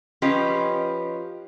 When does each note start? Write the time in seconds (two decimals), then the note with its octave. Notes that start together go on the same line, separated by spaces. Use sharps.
0.22 F3 C#4 F4 G4 B4 D#5